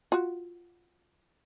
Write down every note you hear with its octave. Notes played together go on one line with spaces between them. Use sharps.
F4 F#4